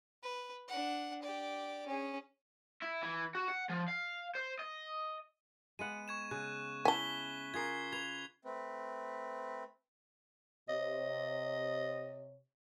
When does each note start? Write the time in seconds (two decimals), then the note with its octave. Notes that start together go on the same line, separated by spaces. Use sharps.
0.23 B4
0.68 D4 F#5
1.22 G4 D5
1.87 C#4 G#4
2.82 E4
3.03 E3
3.35 F#4
3.48 F#5
3.69 F3
3.88 F5
4.35 C5
4.59 D#5
5.79 G#3 B3 F#5 D#7
6.08 C#6 G#6 E7
6.31 C#3 F#6
6.85 C#4 E4 G#5 A5 B6 G7
7.54 F4 G#4 A#4 G#6 C7
7.92 B4 G#6 F7
8.45 A3 C4 B4
10.69 C3 C#5 D#5